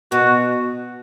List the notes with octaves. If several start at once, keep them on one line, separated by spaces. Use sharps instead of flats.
B2 F#4